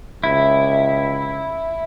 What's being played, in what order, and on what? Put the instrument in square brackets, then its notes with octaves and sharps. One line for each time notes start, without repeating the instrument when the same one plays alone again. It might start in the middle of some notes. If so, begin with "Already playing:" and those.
[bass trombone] C#2 [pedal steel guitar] E4